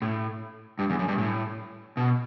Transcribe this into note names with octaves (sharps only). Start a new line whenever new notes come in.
A2
G2
E2
F#2
G2
A2
B2